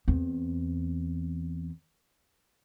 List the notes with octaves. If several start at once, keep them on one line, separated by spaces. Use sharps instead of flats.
E2 C4